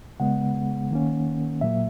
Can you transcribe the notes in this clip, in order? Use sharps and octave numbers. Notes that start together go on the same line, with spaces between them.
C#3 G#3 B3 F#5
D#3 A#3 C#4
A#2 F#3 A#3 E5